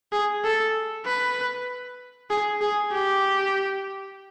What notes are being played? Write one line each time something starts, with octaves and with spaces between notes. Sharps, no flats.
G#4
A4
B4
G#4
G#4
G4